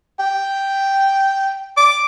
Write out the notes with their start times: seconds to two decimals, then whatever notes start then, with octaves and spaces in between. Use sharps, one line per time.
0.19 G5
1.77 D6